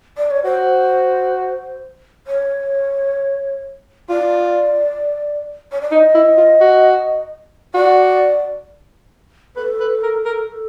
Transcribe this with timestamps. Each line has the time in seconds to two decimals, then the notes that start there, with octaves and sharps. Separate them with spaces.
0.18 D5
0.31 C#5
0.44 F#4 C5
2.27 C#5
4.09 F4 D5
5.72 C#5
5.81 D5
5.91 D#4 D#5
6.15 E4
6.37 F4
6.61 F#4
7.74 F#4 D5
9.56 A4 B4
9.80 B4
10.03 A#4
10.26 A#4